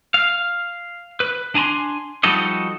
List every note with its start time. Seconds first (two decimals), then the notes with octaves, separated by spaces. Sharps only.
0.14 F5
1.20 B4
1.55 D4 G#5 A#5 C6
2.23 F3 G3 D#4 F#4 A4 D#5